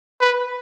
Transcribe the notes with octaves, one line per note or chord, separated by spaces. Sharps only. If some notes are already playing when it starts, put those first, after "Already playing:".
B4